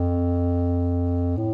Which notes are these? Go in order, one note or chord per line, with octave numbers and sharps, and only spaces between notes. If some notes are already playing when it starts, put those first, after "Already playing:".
Already playing: F2
A2